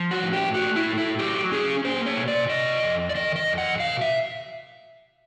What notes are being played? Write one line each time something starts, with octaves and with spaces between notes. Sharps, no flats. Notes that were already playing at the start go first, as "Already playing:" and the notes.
Already playing: F3
F#4
A2
G4
A3 F#4
E4
A2
E4
F#3 G4
C#4 G#4
A#3 C5
C#5
B2
D5
C3 D#5
F2
D5
D#3 D#5
D#5
F2
F#5
B2 F5
E5